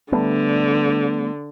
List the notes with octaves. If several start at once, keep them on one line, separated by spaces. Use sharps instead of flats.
D3 G3 A3 B3